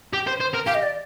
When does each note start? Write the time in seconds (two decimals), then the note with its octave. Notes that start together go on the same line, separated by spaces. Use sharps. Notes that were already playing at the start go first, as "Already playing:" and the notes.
0.13 G4
0.27 C5
0.40 C5
0.54 A#4
0.66 G4 F5
0.75 D#5
0.83 D5